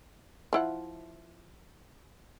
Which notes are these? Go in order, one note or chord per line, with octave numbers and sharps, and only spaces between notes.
F3 E4 F#5